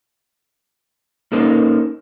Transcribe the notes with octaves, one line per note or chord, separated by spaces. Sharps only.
A#3 C#4 D#4 A4 A#4 C5